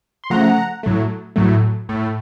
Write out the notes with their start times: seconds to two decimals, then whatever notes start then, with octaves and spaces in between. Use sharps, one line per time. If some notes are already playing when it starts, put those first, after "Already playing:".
0.24 C6
0.30 C#3 F3 A3 F#5 A#5
0.83 A2 F#3 A3
1.36 A2 F#3 A3
1.89 A2 A3